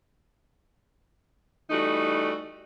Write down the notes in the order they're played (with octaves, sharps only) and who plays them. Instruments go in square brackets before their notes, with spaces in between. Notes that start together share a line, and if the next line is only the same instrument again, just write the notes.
[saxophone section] E3 G3 A3 D#4 F#4